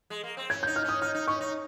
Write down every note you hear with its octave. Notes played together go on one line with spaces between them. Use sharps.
G#3
A#3
C4
C#4 G#6
G6
D#4
F6
C#4 D#6
D#4 F6
D#4
C#4 C#6
D#4